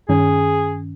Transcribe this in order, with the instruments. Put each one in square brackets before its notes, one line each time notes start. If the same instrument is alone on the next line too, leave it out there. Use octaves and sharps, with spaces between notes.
[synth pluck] G2 D#3 C#4 [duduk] G#4